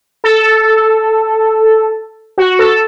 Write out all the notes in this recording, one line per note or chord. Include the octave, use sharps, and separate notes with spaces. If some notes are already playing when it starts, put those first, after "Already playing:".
A4
F#4
A4